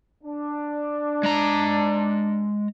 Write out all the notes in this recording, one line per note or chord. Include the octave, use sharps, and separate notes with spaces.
D4
G#3 A#5